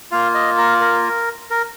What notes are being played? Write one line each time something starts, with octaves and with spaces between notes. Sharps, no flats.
A#3 F4 F5
D#5
A#4
A#4
A#4